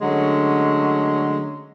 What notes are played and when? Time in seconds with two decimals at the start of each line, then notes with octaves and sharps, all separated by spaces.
0.01 D3 F#3 G#3 A3 C#4